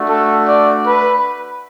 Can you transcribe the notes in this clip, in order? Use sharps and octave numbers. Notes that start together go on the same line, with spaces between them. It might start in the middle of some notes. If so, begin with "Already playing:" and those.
Already playing: A3 D4 F#4
A4
D5
B4